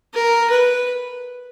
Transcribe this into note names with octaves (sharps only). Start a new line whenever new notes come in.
A#4
B4